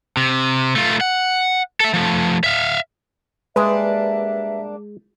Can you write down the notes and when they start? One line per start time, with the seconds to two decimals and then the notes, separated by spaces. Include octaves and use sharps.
0.17 C3
0.76 A3 F4
1.01 F#5
1.80 A4 E5
1.94 F3 A3
2.44 E5 F5
3.56 G3 G#3 A#3 D4 B4 E5